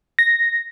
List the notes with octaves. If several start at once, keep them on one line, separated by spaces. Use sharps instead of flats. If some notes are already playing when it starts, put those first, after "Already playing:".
A#6